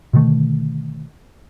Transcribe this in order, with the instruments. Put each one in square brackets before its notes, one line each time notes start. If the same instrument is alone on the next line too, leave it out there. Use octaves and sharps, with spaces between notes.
[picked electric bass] B2 D3 D#3 A3